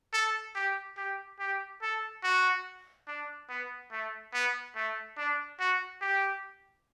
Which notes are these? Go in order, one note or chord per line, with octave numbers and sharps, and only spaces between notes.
A4
G4
G4
G4
A4
F#4
D4
B3
A3
B3
A3
D4
F#4
G4